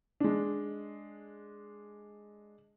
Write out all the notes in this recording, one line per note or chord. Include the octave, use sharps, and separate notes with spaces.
G#3 D4